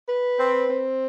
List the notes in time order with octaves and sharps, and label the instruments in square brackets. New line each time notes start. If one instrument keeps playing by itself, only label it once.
[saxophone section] B4
C4
C4